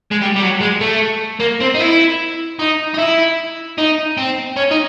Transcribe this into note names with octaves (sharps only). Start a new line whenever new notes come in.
G#3
G3
G3
F#3
G#3
A3
A#3
C4
D#4
E4
D#4
D#4
E4
D#4
C4
C#4
D#4